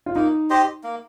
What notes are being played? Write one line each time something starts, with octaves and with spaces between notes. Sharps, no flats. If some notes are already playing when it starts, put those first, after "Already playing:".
F4
A#3 D#4
G4 C5 D#5
A#3